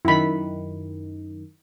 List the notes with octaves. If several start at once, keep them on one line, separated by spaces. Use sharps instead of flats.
F#2 D#3 E4 B5